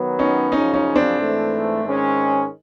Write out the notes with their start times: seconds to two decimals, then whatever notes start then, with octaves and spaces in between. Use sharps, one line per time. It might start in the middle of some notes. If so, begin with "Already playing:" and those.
Already playing: D#3 F#3 B3
0.19 C#4 D#4
0.52 F#2 C#3 F3 C#4 D#4
0.74 C#4 D#4
0.96 C4 D4
1.18 G#2 E3 A3
1.84 G#2 D#3 G#3 C#4